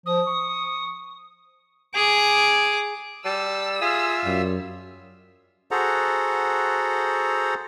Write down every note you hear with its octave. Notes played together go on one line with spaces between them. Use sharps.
F3 D#6
C#6
G#4 D6
G3 A5 E6
F4 G#4 E5 F5
F#2 G3
F#4 G#4 A4 C5 F#5 A#5